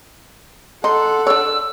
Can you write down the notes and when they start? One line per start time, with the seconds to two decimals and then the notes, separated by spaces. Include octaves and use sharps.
0.84 D#4 A4 F#5 C6
1.27 D4 C#5 E6